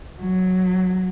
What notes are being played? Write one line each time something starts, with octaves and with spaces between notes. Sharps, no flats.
F#3